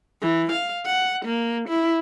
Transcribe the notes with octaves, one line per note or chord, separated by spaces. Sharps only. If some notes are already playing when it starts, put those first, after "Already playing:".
E3
F5
F#5
A#3
E4